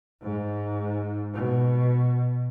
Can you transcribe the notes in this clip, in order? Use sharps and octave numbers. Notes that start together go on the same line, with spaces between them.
G#2
B2